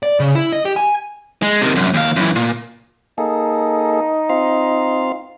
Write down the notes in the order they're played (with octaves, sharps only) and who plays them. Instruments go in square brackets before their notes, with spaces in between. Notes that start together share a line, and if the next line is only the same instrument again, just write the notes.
[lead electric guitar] D5
C#3
E4
D#5
G4
G#5
G#3
C3 D#3
C2 F#2
D#2 F5
F#2 E3
A#2
[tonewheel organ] A#3 G#4 A4 [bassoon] D#4
[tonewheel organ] C4 F4 F5